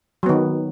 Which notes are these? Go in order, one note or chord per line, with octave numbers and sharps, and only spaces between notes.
D#3 F#3 B3